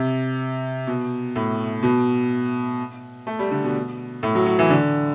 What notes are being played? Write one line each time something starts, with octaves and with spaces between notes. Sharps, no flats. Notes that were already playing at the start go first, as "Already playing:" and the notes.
Already playing: C3
B2
A2
B2
A3
G3
D3
B2
A2
F#3
F#3
E3
D3